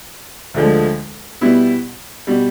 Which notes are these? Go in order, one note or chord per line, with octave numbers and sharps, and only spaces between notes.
D2 D3 F3 G#3
B2 G3 B3 E4
B2 G3